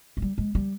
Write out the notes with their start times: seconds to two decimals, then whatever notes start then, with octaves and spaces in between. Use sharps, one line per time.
0.17 G#3
0.22 G3
0.38 G#3
0.55 G3